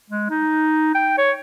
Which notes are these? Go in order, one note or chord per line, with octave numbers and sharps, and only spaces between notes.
G#3
D#4
G5
C#5